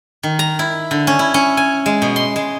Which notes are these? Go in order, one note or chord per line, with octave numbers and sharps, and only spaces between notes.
D#3
A#5
E4
D3
C#4
E4
C#4
G#5
G#3
B2
C6
G#3